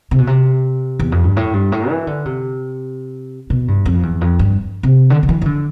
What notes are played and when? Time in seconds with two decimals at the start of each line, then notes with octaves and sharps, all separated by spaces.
0.11 C3
0.18 B2
0.27 C3
0.99 E2
1.12 F2
1.24 G2
1.37 A2
1.53 G2
1.72 A2
1.89 E3
2.07 D3
2.25 C3
3.50 B2
3.68 G2
3.86 F2
4.03 E2
4.21 F2
4.39 G2
4.83 C3
5.10 D3
5.23 D3
5.29 E3
5.41 E3
5.46 D3